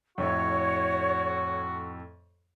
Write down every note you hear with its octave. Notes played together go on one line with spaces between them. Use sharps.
F2 A2 E4 F#4 C#5